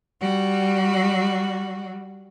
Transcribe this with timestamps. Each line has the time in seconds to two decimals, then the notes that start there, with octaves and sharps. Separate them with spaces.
0.20 G3 F#4